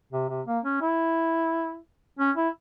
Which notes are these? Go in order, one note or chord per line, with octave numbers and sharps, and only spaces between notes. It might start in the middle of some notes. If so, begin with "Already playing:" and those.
C3
C3
A#3
C#4
E4
C#4
E4